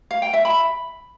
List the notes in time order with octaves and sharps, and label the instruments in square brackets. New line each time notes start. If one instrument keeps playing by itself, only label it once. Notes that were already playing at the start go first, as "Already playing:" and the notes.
[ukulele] F5
G5
E5
B5